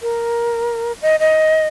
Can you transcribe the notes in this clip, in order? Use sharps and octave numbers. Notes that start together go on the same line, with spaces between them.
A#4
D#5
D#5